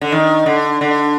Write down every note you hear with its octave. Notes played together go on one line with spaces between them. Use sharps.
D3
D#3
D3
D3